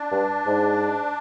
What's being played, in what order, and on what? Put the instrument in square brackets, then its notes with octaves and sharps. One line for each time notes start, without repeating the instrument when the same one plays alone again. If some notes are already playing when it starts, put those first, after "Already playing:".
Already playing: [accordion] D4
[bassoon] G2
G#2